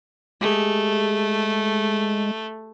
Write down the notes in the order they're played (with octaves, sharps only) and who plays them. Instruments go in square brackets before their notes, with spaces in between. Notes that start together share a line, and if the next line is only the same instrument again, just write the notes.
[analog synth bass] G#3 [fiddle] A3 [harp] G4 G#4